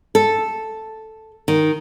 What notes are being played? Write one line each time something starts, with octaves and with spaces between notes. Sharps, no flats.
A4
D#3